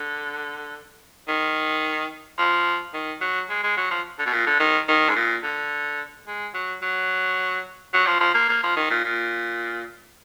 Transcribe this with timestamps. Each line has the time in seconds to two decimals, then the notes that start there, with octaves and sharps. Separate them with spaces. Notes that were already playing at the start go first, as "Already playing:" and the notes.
Already playing: D3
1.28 D#3
2.39 F3
2.94 D#3
3.21 F#3
3.50 G#3
3.64 G#3
3.77 F#3
3.91 F3
4.19 D3
4.26 B2
4.33 A#2
4.47 D3
4.60 D#3
4.88 D#3
5.09 G#2
5.16 A#2
5.44 D3
6.27 G#3
6.54 F#3
6.82 F#3
7.94 F#3
8.07 F3
8.21 F3
8.34 A#3
8.49 A#3
8.63 F3
8.77 D#3
8.90 A#2
9.04 A#2